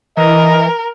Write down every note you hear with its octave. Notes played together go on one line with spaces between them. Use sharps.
E3 A#4 D#5